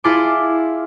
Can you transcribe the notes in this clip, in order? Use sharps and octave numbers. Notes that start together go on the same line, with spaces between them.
E4 F4 G#4 A5 C6 D6